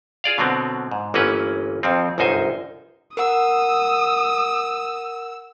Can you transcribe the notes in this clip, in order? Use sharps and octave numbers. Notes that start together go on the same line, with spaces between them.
F4 G#4 D5 F5
B2 D3 F#3 B3 C4
G#2
G1 E3 A#3 C#4 B4
F2 F3 C4
G1 C2 F#2 D#4 C5 G#5
A#4 F#5 D#6 E6